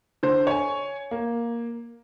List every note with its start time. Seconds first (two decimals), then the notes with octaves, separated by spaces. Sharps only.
0.23 D3 C5
0.47 C#5 G#5
1.11 A#3